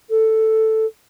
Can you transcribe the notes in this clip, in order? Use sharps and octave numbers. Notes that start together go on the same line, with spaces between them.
A4